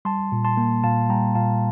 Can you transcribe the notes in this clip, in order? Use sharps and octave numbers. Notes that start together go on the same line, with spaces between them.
G3 A5 C6
A#2
A5 C6
A#3
A#2 F5 A5
G3 G5 A#5
A#2 F5 A5